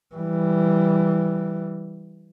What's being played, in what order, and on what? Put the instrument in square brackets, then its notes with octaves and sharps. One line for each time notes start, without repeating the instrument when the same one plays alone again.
[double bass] E3 G3